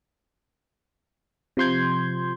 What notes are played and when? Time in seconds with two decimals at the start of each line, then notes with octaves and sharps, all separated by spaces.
1.57 C3 F3 C6 G6 G#6